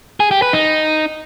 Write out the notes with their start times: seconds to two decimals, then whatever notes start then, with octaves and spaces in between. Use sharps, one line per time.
0.20 G#4
0.31 G4
0.42 B4
0.53 D#4